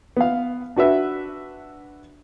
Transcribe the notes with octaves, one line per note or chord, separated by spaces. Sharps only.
B3 F5
D4 F#4 B4 E5